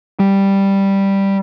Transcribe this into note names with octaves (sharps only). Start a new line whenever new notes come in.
G3